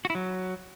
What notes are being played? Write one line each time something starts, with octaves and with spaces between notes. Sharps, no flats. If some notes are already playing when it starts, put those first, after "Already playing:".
F#4
E4
F#3